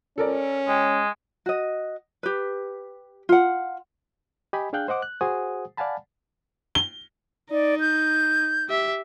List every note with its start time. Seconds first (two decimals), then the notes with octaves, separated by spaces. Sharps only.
0.18 C#4 A4 A#4 D5
0.68 G#3 G5
1.46 F#4 D#5
2.23 G4 B4
3.29 F4 F#5
4.53 G4 D#5 G#5 B5
4.73 D4 G#4 F5 G5 F#6 G6
4.88 C5 D#5 F#5 D6
5.02 F#6
5.21 F#4 G#4 C5 F#5 G#5 D#6
5.77 D5 F5 F#5 G#5 A5 B5
6.75 G7
7.51 D#4 D5
7.80 G6
8.69 G4 E5